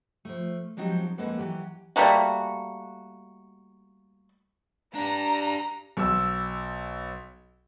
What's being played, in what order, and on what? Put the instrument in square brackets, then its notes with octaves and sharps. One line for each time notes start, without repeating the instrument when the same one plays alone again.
[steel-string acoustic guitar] F3 A3
F3 F#3 G#3 C4 D#4 G4
F2 G#3 A#3 A4 B4 F#5
E3 F#3 F#4 G4
[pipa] G3 A3 A#3 F#4
[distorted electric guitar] D4 G4 [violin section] A#5
[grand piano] B1 E6